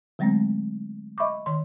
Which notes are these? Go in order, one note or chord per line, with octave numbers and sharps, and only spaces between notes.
D3 F#3 G#3 A3 B3 C4
D#5 E5 B5 C#6 D6
D#3 C6